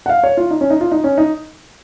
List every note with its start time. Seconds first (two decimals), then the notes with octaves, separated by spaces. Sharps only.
0.06 F#5
0.09 F5
0.24 C#5
0.37 F4
0.51 D#4
0.61 C#4
0.70 D#4
0.81 F4
0.91 D#4
1.04 C#4
1.18 D#4